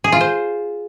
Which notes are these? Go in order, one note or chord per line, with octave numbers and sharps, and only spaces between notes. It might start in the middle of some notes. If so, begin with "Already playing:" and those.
G#4
F4
C5